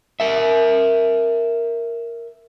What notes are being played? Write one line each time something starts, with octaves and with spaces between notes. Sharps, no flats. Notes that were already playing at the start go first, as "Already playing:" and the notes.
A#4 E5